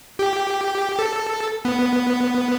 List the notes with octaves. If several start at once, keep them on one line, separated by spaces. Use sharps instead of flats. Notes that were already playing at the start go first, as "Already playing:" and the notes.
G4
A4
B3